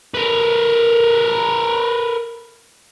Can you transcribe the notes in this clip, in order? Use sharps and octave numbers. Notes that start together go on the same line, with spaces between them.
A#4 B4